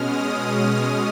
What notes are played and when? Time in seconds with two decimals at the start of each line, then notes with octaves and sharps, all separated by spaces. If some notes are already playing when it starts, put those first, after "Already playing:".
Already playing: B2 G#3 C#4 D#6 F6
0.23 F6